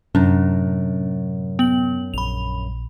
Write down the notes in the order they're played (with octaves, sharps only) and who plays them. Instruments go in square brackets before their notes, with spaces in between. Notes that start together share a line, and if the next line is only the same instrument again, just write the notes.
[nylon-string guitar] F#2 [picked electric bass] A2 C3 F#3 [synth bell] C#4 D4
[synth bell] B3 F#7
[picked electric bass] A#1 [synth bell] B5 F7